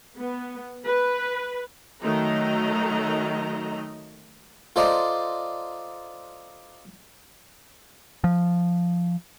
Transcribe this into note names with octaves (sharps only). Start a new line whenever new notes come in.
B3
B4
D#3 F#3 A3 D#5 A#5
F4 A4 C5 D5 D#5 A#5
F3